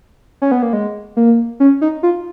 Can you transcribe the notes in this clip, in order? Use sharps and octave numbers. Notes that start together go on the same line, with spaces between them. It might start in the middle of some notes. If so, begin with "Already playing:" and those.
C#4
B3
A#3
G#3
A#3
C#4
D#4
F4